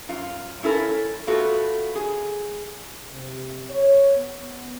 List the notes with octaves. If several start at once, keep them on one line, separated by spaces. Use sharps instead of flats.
F#2 F4
C#4 E4 A4 A#4
A3 B3 F4 F#4 A4
G#4
C3
C#5
B3